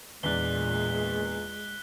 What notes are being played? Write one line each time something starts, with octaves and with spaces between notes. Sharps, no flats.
E2 A#2 G#3 D4 F#6 B6 G7